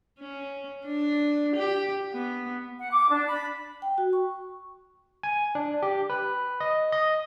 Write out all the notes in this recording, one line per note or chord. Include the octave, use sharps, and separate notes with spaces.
C#4
D4
G4
B3
F#5
D6
D4
B5
G5
F#4
C#6
G#5
D4
G4
B4
D#5
D#5